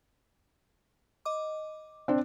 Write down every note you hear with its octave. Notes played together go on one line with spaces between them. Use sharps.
D#5 D6
C4 D4